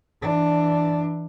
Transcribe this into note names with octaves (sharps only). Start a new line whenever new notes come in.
E3 D4